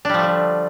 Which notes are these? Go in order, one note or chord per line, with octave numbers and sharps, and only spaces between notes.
D3 F3 G3 A3 D4